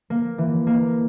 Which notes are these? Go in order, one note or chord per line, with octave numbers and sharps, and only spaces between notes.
A#3
E3
A#3